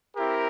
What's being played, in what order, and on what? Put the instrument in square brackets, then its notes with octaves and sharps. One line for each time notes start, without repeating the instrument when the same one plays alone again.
[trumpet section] C4 E4 G4 A#4